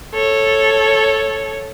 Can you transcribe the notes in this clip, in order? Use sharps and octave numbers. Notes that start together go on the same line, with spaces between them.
A4 C#5